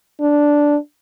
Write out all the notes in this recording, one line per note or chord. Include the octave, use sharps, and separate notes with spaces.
D4